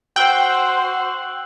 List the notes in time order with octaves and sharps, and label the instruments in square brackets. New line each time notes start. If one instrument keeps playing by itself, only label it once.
[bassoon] F#4 [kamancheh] C5 C6 [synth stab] G5 [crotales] E6 F#6 F#7